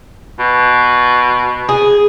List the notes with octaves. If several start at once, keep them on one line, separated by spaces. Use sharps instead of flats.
B2
G#4